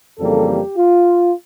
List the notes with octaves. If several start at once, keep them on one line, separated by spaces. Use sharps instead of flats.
F2 C#3 E3 G3 A#3 A4
G4
F4